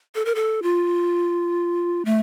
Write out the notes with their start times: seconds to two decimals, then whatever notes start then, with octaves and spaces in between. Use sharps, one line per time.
0.15 A4
0.25 A#4
0.35 A4
0.62 F4
2.05 A3